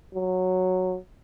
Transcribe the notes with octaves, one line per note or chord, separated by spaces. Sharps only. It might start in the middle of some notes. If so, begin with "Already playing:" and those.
F#3